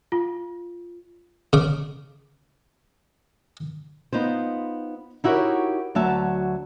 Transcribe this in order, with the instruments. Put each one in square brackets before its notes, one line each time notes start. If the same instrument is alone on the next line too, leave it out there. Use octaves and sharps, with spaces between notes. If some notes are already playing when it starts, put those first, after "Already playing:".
[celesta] F4
[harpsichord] C#3 D6
[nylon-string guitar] B3 D#4 F4 C5
D#4 E4 F#4 G4 A#4 C#5
D2 F#3 E5 A5